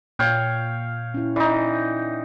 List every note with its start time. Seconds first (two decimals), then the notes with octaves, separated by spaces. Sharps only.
0.19 A#2 C#5 F5 G5
1.14 C#4 E4
1.36 E3 D#4 D5